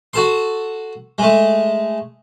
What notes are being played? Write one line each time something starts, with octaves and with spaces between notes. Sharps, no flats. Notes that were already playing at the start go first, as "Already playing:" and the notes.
F#4 A4 C6
G#3 A3